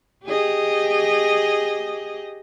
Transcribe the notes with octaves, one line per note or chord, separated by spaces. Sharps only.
G4 G#4 D#5